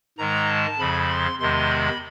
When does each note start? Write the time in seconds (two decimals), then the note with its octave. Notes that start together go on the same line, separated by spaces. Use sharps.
0.18 G#2 D#3 G#3 A#5
0.49 A5
0.79 F2 C#3 F3 B5
1.09 C6
1.39 E2 C3 D#3 G#3 C6
1.70 B5